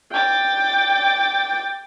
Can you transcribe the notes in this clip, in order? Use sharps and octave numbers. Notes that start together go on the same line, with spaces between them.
G5 D6 A6